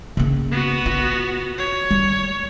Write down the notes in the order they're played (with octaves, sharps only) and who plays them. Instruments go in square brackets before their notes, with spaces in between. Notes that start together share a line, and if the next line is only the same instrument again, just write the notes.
[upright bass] C#3 A#3
[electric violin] B3 F#4
[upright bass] F4
[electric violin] C#5
[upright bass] G3